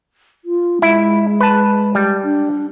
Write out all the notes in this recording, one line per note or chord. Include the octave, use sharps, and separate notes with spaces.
F4
G#3 E4
B4 A5
G3
D4